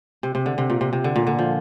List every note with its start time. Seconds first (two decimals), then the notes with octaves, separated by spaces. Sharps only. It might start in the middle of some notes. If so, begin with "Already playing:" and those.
0.23 C3
0.35 C3
0.46 D3
0.58 C3
0.70 A#2
0.81 C3
0.93 C3
1.04 D3
1.16 A#2
1.27 D3
1.39 F3